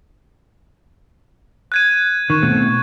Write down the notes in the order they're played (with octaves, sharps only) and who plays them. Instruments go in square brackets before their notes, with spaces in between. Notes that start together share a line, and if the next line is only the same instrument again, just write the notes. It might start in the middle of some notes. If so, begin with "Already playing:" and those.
[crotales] F#6 G#6 D#7
[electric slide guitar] D#3 [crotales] C#6
[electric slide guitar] B2 A3 C4